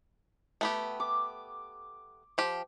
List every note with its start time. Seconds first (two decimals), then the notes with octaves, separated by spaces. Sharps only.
0.61 A3 B3 G4
1.00 D6
2.38 F3 G4